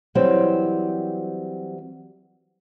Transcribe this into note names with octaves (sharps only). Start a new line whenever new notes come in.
E3 F#3 G3 C4